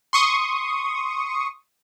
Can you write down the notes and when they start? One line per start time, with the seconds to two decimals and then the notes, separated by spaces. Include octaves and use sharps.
0.13 C6 C#6 D#6